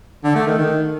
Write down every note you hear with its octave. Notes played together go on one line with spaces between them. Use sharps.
D3
A3
D#3
D#3